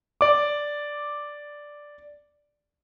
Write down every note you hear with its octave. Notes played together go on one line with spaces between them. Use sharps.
D5 D6